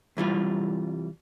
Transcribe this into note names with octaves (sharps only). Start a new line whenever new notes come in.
C2 E3 G3 F4